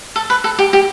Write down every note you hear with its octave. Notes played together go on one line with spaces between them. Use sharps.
A4
B4
A4
G4
G4